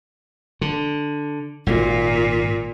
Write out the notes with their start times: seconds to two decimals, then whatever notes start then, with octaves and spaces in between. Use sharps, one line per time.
0.61 D3
1.66 G#1 A#2